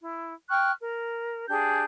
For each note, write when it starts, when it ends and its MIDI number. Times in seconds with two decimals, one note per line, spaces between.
0.01 0.32 64
0.49 0.72 79
0.49 0.72 85
0.49 0.72 89
0.49 0.72 90
0.80 1.46 70
1.48 1.84 62
1.48 1.84 67
1.48 1.84 68
1.48 1.84 91